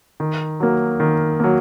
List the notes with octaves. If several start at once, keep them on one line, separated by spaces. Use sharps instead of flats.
D#3
F#3 A#3
D#3
F#3 A#3